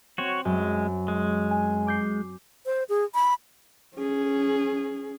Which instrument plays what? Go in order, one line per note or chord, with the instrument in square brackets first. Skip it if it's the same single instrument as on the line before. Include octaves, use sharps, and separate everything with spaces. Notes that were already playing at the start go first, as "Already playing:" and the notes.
[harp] C4 [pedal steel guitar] F#4 C#5
[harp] F#2 [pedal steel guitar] G#3
[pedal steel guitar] G#3
[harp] G#5
D6 G6 C7
[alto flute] C5
G#4
B5
[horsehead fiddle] C#4 G#4